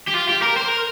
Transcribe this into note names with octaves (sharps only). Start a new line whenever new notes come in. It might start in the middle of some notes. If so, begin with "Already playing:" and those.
G4
F4
G4
A#4
C5
A#4